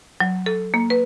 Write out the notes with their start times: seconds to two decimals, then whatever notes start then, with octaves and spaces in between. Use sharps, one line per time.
0.20 F#3
0.46 A4
0.74 A#3
0.90 B4